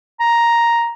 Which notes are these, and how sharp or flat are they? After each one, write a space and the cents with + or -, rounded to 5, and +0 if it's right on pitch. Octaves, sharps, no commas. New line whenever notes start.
A#5 +5